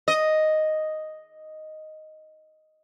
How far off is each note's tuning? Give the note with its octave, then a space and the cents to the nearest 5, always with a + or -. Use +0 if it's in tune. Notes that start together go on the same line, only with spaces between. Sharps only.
D#5 +0